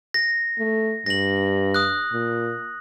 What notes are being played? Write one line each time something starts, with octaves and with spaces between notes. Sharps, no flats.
A#6
A3
G2 A#6 F#7
D#6 F#6
A#2